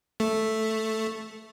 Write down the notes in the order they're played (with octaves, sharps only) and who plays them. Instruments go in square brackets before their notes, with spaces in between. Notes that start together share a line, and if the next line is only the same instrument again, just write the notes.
[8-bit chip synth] A3